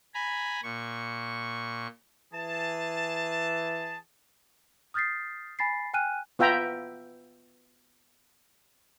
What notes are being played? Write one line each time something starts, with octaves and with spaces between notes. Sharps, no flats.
G#5 A#5 B5
A#2 C#6
E3 G#4 A5
D#6 F6 G6 A6 B6 C7
G#5 B5 A6 B6 C7
G5 G#5 F6 F#6 D#7
B3 F4 E5 G5 A#5 B5